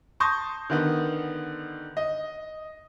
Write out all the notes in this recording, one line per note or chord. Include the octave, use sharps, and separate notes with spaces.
A5 C6 C#6 D#6 G6 A#6
D3 D#3 B3
D#5